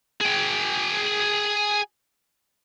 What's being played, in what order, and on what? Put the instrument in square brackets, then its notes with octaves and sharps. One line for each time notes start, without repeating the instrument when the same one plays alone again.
[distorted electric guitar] G#4 G5